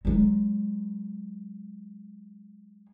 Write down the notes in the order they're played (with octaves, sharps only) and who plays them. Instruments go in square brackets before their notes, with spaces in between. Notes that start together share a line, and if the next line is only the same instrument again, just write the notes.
[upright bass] F#3 G#3